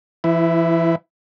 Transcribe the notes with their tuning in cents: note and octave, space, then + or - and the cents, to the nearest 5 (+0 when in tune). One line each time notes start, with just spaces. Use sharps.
E3 +35 E4 +0